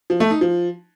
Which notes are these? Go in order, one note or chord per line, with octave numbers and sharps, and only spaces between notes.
F3
A3
D#4
F3